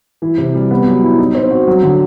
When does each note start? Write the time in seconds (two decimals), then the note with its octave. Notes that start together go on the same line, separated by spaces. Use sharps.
0.22 E3
0.38 C3
0.55 G3
0.71 B3
0.87 F#3
1.03 E4
1.18 D#4
1.35 C4
1.51 F#4
1.68 F#3
1.83 D3